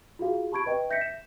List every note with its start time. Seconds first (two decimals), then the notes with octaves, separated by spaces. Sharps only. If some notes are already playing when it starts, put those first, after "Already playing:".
0.19 F4 F#4 G#4 F5
0.52 G4 A5 B5 C#6 G#6 D7
0.66 B4 D#5 G5
0.90 E5 G6 A#6 B6 C#7
1.01 E7